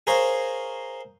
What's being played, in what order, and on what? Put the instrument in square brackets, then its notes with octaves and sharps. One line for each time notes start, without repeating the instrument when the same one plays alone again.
[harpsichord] G#4 A#4 C5 C#5 F5